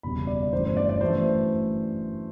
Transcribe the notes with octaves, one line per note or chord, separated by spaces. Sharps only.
F#1 E2 B2 G3 B5
D5
D5
G1 F#2 E3 A3 C5
C5
D5
D5
F#2 E3 A3 C5